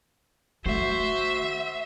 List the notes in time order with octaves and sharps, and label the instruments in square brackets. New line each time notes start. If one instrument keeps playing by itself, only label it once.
[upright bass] D3 A3 [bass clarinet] F#4 [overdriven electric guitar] C5 [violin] E5